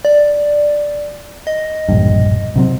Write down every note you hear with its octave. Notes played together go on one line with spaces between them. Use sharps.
D5
D#5
E1 A#1 G2
C3 F#3 C4